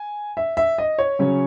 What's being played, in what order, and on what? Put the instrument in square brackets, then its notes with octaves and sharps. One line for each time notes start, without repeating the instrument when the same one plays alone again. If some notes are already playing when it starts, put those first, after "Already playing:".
Already playing: [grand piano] G#5
E5
E5
D#5
C#5
C#3 F#3 C#4